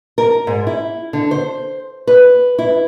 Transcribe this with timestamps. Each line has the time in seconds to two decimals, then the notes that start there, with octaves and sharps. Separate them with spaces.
0.18 A#4
0.47 G#2
0.67 E4
1.13 D3
1.31 C5
2.07 B4
2.58 E4